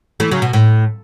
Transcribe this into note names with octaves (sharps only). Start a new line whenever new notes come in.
E3 A3
C#3 F#3
B2
A2